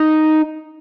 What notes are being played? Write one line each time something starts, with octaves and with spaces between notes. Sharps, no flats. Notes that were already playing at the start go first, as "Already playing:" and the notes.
Already playing: D#4